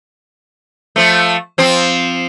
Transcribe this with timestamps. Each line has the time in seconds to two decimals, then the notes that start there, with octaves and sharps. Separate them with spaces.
0.96 F3 A3
1.58 F3 C4